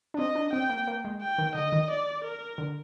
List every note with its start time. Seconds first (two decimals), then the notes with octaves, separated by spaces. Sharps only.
0.14 D4
0.18 C4 D#5
0.35 D4
0.53 C4 G5
0.70 A#3
0.87 A#3
1.05 G#3
1.22 G5
1.38 D#3
1.55 D3 D#5
1.72 D#3
1.90 D5
2.24 A#4
2.58 D3